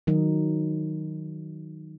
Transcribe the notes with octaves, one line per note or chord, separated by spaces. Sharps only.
D#3 F#3 D#4